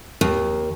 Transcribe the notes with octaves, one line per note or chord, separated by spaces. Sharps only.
D#2